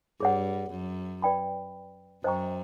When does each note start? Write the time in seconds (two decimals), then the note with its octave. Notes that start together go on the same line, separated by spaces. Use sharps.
0.20 G2 G#4 C#5 F#5
0.71 F#2
1.22 B4 D5 G5 B5
2.24 F#2 C5 D#5 G5 A#5 C#6